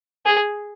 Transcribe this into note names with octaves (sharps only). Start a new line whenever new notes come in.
G#4